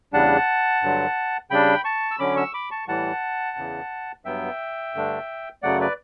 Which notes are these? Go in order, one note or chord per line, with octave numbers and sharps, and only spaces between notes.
E2 C#3 G3 D4 F#5 A5
G2 D3 F#3
C#3 G3 D4 G5 B5
A5 C#6
E6
D3 F#3 C#4 B5 D6
C#6 E6
B5 D6
A5 C#6
A2 E3 G3 F#5 A5
E2 C#3 E3
G2 F#3 B3 E5 G5
G2 D3 A3 D4
F#2 C#3 F#3 A3 D5 F#5
B4 D5